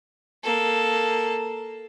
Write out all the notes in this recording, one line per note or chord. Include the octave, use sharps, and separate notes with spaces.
A#3 A4